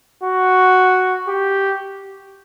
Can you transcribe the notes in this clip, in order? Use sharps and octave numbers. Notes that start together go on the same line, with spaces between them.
F#4
G4